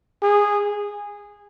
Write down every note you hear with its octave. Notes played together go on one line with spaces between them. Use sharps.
G#4